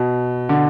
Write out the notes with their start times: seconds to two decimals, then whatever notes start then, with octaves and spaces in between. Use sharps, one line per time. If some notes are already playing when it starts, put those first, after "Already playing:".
Already playing: B2
0.49 D3